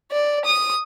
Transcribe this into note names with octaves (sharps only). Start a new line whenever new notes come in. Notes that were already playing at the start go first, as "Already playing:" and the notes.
D5
D#6